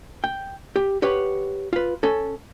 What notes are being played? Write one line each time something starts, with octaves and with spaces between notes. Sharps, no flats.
G5
G4
G4 B4 C#5 F#5
F4 B4
C#4 A4